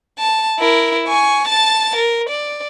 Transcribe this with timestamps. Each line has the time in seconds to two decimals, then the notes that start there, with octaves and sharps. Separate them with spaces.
0.19 A5
0.59 E4 A#4
1.08 G#5 C#6
1.47 A5 A6
1.96 A#4
2.29 D5